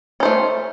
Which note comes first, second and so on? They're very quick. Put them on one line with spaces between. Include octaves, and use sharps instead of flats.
C#4 C5 A3